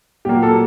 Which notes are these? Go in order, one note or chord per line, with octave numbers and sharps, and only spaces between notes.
A#2 F#3 A#3 G4
A4